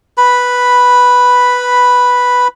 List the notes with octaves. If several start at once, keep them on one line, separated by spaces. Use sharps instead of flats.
B4 B5